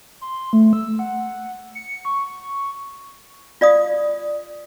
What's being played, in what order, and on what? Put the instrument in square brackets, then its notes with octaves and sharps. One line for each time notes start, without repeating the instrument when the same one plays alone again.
[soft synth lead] C6
A3
E6
F#5
C#7
C#6
[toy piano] F4 D5 F5 D#6